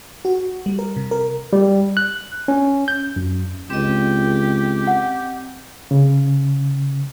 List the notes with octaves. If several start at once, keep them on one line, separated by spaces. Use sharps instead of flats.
F#4
G3
A#4
C3
A#4
G3
F#6
C#4
G6
F#2
C#2 C4 G4 D#5
F#5
C#3